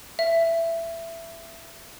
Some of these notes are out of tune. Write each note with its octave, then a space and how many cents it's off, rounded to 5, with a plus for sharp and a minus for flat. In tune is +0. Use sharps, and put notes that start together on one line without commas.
E5 +15